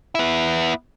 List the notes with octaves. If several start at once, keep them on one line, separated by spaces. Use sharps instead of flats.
B3 E4